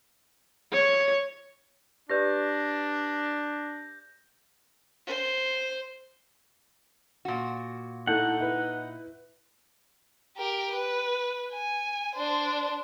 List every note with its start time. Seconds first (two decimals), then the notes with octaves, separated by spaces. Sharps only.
0.73 C#5
2.10 D4 G4 B4 D5 G6 A#6
5.07 C5
7.25 A#2 F#4
8.07 A2 D#4 A4 F#5 G6
8.40 E4 B4
10.38 G4 A#4
10.74 B4
11.53 G#5
12.15 D4 C5